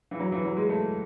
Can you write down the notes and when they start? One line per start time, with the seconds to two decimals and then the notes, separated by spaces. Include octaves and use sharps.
0.11 E3
0.20 F#3
0.32 E3
0.45 F#3
0.57 G#3
0.69 A3